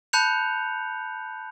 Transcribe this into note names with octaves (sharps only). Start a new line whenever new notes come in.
A5 B5 F#6 G6 C#7 F7